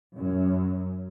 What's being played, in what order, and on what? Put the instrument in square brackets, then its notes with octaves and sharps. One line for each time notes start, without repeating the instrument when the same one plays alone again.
[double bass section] F#2